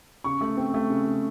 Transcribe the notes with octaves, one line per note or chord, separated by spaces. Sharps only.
C#3 C#6
A3
C4
A3
C#3
C#3